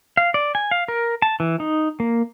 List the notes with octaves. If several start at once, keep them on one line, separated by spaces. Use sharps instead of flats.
F5
D5
G#5
F5
A#4
A5
E3
D#4
A#3